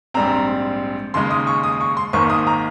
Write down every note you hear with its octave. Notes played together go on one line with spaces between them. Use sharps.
A#1 G#2 G3 C4 A#5
D#2 C#3 G#3 D#4 C6
D#6
C#6
D#6
C#6
C6
G#1 G#2 D#3 A#3 C#6
D#6
A#5